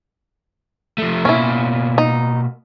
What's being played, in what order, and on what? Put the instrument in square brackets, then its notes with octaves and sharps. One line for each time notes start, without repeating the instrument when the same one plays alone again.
[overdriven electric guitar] F3 A3
[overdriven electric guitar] B2 A#3 [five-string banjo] C#4 E4
[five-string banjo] D#4